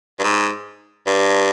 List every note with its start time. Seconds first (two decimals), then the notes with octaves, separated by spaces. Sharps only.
0.19 G2
0.24 G#2
1.07 G2